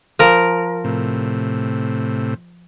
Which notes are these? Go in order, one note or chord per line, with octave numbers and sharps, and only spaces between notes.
F3 A#4
A2 C3